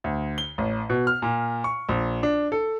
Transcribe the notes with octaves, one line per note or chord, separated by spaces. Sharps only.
D2
G7
A1
B2
F6
A#2
C#6
A#1
D4
A4